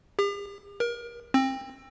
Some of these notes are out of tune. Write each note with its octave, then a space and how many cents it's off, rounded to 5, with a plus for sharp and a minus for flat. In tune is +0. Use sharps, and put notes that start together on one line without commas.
G4 +45
A#4 +30
C4 +25